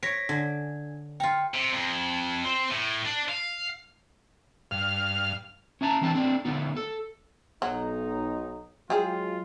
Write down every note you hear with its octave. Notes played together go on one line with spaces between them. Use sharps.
C#5 A#6 B6 D7
D3 D4
F4 G5 A#5
C3
F2
C4
A2
D4
F5
G2 F5 F6
C#4 E5 A5 A#5
E3 C4 D4 E5 A5
A3 C4 D4
D3 A3 B3 D#4
A4
B1 F#3 D#4
F#3 G#3 F4 G4 G#4